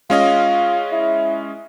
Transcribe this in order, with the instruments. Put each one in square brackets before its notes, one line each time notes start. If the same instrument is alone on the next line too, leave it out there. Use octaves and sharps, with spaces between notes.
[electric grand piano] G#3 C#4 D#5 [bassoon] F4
[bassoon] E4